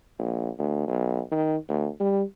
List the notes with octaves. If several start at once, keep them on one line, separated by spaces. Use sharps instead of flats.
A#1
D2
B1
D#3
D2
G3